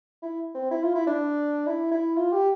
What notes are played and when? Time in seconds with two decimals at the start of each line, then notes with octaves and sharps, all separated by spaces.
0.22 E4
0.55 C4
0.71 E4
0.83 F4
0.95 E4
1.07 D4
1.67 E4
1.91 E4
2.16 F4
2.32 G4